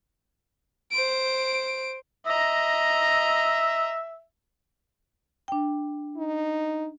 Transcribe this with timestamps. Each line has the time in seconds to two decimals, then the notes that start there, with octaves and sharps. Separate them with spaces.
0.92 C5 D7
2.27 D#5 E5 A#5
5.48 D4 G5
6.18 D#4